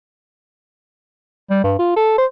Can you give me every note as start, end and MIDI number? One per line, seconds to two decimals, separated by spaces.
1.50 1.63 55
1.64 1.74 43
1.79 1.93 65
1.96 2.16 69
2.18 2.26 72